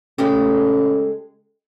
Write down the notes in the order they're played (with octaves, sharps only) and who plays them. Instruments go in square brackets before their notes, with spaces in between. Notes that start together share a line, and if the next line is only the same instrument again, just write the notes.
[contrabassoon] C#3 [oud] G#3 A3 G4